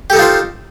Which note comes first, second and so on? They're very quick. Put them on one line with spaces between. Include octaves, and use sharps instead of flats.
G4 A4 D#4 F4 C5